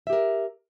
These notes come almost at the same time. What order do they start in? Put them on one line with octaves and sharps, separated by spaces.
E5 G4 A#4